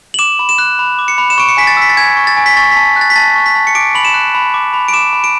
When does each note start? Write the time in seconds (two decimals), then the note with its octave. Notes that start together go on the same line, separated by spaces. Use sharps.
0.14 F#7
0.19 D6 E7
0.39 B5
0.49 E7
0.58 F#6
0.79 B5
0.99 D6
1.08 C#7
1.18 B5
1.30 E7
1.38 C#6 D7
1.49 C#7
1.57 G#5 B6
1.67 A6
1.77 E6 B6
1.89 A6
1.97 G#5 G#6
2.17 C#6
2.27 A6
2.37 G#5
2.46 B6
2.57 C#6 A6
2.71 A5 B6
2.96 F#6
3.01 A6
3.10 B6
3.16 A5 A6
3.35 C#6
3.46 B6
3.55 A5
3.67 C#7
3.75 D6 D7
3.95 B5 F#7
4.05 E7
4.14 F#6
4.35 B5
4.54 D6
4.74 B5
4.88 D7
4.93 D6 E7
5.13 B5
5.24 D7